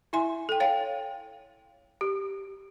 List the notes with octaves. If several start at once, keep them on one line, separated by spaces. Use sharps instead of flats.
E4 E5 G#5 C6
A4 G5
C#5 F5 G5
G4